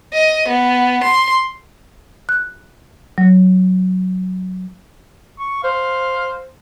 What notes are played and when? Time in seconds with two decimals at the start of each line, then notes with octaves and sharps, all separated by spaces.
0.13 D#5
0.48 B3
1.03 C6
2.29 F#6
3.18 F#3
5.39 C#6
5.64 C5 F5